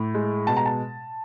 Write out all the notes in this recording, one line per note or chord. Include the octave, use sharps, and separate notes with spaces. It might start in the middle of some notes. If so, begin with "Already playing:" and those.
Already playing: A2
G#3
B2 A5
A#5
A5